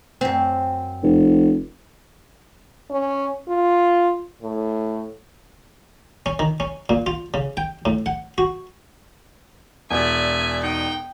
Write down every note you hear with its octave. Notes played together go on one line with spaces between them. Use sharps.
F#2 C4
F1
C#4
F4
A2
C#4
D#3
C#4
A#2
F4
C#3
G5
A2
F#5
F#4
E1 D5 E5 G#5
D#4 G5